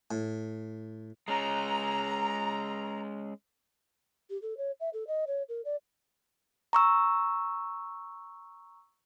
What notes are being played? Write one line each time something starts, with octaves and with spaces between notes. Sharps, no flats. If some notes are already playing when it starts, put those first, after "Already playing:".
A2
G#3 C#4 A#5
G4
A4
C#5
E5
A4
D#5
C#5
A#4
D5
A#5 C#6 E6